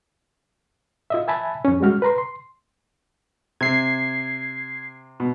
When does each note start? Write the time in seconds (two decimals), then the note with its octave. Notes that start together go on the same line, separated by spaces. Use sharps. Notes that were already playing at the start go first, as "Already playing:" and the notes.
1.10 F4 D#5 E5
1.28 E5 G#5 A5 B5
1.65 F2 C#4
1.80 G3 G#3 C#4 F#4 F6
2.02 B4 A#5 C6
2.18 C6
3.61 C3 G#6 C7
5.20 B2